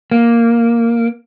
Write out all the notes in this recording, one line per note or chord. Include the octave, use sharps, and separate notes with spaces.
A#3